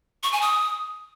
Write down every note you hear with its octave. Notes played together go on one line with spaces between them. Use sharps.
C#6
G#5
D#6